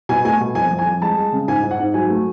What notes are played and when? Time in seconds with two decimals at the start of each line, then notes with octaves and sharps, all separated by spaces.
0.09 B2 G#5
0.25 A3 G#5
0.40 B2
0.55 F2 G#5
0.71 F2
0.79 G#5
0.86 F2
1.02 G#3 A5
1.17 G#3
1.32 C#3
1.48 G#2 G#5
1.63 G#2
1.71 F#5
1.79 G#2
1.94 F#3 G#5
2.10 A3